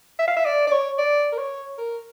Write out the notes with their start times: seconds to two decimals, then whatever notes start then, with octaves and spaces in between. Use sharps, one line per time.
0.19 E5
0.28 F5
0.36 E5
0.45 D5
0.67 D5
0.71 C#5
0.98 D5
1.32 A#4
1.38 C#5
1.78 A#4